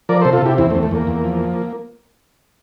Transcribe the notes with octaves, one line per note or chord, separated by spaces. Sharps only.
F3 A#4 D5
C3 A4 C5
F4 A4
C3 E4 G4
E2 C4 E4
A3 C4
E2
A3
E2 A#3
E2
F3